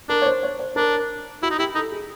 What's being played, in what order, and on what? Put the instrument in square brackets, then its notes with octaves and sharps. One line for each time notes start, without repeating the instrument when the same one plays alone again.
[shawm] D4 [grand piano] A#4
[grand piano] C#5
C5
C#5
C5
[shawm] D4 [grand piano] A#4
[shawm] E4 [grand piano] F#4
[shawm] D#4
[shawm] E4 [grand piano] G4
[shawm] D#4 [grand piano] A4
[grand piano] G#4